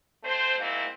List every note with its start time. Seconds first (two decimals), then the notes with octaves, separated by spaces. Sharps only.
0.23 A3 C4 C5
0.58 G#2 B2 A#3 C4 E4